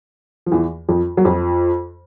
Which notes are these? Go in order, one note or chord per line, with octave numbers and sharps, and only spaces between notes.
F3
E2 E3
F2 F3
F#3
F2 F3